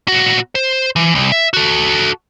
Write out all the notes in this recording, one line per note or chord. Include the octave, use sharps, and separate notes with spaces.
A#2 F#4
C5
E3
C2
E5
F#4 A4